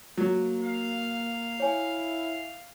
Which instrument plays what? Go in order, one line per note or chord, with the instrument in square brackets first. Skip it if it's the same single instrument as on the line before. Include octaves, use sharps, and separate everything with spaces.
[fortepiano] F#3 [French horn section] A#3
[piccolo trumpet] F5
[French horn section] E4 [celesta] C#5 G#5